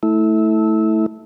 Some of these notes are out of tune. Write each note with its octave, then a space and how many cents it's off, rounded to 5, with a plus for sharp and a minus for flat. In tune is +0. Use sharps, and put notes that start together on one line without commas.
A3 +0 E4 -20